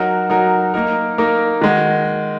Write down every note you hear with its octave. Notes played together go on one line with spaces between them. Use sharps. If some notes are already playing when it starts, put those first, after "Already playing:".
Already playing: F#3 D#4 F#4 A#4
F#3 D#4 F#4 A#4
A#3 D#4 A#4
A#3 D#4 A#4
D#3 G#3 F#4